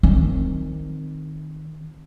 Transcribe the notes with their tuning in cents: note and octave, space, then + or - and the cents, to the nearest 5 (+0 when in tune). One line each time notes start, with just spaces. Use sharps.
D#3 -10 C4 +0